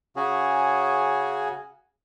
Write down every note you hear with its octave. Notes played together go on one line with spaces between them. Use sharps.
C#3 C#4 F#4 G#4